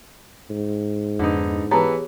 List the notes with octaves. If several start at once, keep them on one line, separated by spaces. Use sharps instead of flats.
G#2
F2 D3 B3 D#4
E3 B3 G4 G#4 C#5 A5 A#5